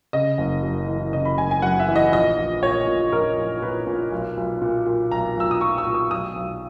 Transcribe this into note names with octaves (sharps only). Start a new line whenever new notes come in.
C#3 D#5
F#1
F#2
E3
C#3 D#5
B5
F#1 G#5
G#5
F#2 F#5
E5
E3
D#5
A#1 D#5
A#1
A#2 C#5
A#2
A#1 A#4
A#1
A#2 B4
A#2
B1
B1
A#2
A#2
B1 A#5
B1 E6
D#6
A#2 C#6
E6
A#2
D#6
B1 D#6
B1